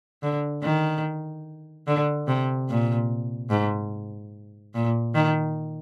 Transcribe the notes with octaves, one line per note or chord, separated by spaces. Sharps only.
D3
D#3
D3
C3
A#2
G#2
A#2
D#3